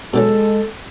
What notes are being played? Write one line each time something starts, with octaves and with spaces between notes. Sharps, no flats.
B2 D3 F#3 G#3 A4